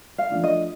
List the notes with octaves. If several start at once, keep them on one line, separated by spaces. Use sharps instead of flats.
F5
F3 A3 D4 F4
D#5